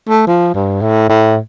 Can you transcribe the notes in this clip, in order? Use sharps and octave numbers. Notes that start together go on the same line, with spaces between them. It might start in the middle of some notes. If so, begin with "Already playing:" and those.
A3
F3
G2
A2
A2